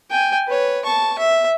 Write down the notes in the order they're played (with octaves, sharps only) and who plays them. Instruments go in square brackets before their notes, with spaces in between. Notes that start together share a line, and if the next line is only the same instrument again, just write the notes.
[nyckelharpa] G5 G#5
B4 C#5
A5 C#6
E5